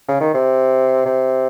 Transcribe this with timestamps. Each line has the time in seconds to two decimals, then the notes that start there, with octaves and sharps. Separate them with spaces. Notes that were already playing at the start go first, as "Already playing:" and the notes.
0.08 C#3
0.21 D#3
0.34 C3
1.06 C3